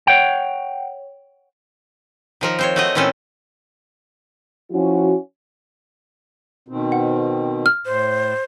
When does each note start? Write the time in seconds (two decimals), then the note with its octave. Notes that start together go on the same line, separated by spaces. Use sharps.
0.07 C#5 F#5 G5
2.41 D#3 F3 A#4
2.59 C4 C5 C#5
2.76 A3 F#4 D#5
2.95 A#2 E3 C4 C#4 A4
4.71 F3 C#4 E4 F#4
6.68 B2 D#3 C4
6.92 F#5
7.66 F6
7.86 A2 C5